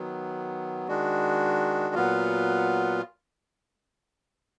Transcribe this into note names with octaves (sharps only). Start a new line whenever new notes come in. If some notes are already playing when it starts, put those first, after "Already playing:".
Already playing: D#3 F#3 B3
D#3 G#3 D4 F#4
A#2 F#3 B3 F4